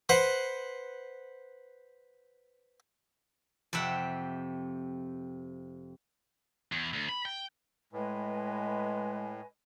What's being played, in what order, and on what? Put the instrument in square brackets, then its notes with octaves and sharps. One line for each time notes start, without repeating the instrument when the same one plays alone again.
[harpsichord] B4 C5 F#5
[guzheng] F2 C3 G4 E5 F#5
[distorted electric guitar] E2
D2
B5
G5
[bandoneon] A2 [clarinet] G#3 [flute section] B4 D#5 G#5